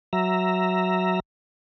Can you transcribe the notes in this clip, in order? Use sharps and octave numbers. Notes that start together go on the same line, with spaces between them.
F#3 E5 A#5